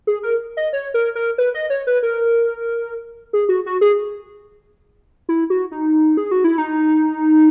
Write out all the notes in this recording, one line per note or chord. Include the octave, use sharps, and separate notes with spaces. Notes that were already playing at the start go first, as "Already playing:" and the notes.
G#4
A#4
D#5
C#5
A#4
A#4
B4
D#5
C#5
B4
A#4
G#4
F#4
F#4
G#4
E4
F#4
D#4
G#4
F#4
E4
D#4